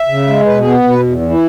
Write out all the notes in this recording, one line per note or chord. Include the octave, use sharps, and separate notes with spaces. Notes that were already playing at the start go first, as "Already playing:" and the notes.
Already playing: E5
C#3
G#3
B2 B4
B3 G#4
B2 B4
E2
E3
E4